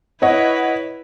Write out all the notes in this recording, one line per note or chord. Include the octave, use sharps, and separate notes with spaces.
E4 B4 C#5 D#5 F#5